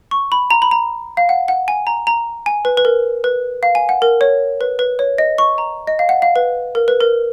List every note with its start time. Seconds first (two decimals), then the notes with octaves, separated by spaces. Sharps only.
0.11 C#6
0.32 B5
0.50 A#5
0.62 B5
0.71 A#5
1.17 F5
1.29 F#5
1.48 F#5
1.68 G#5
1.87 A#5
2.07 A#5
2.46 G#5
2.65 B4
2.77 B4
2.85 A#4
3.24 B4
3.63 F5
3.75 G#5
3.89 F#5
4.02 A#4
4.21 C#5
4.61 B4
4.79 B4
4.99 C#5
5.18 D#5
5.38 C#6
5.58 A#5
5.87 D#5
5.99 F5
6.09 F#5
6.22 F5
6.36 B4
6.75 A#4
6.88 B4
7.01 A#4